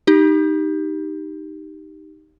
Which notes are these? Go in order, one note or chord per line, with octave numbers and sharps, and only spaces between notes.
D#4 G4